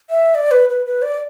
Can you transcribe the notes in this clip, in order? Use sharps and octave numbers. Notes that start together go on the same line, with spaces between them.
E5
D5
B4
B4
B4
D5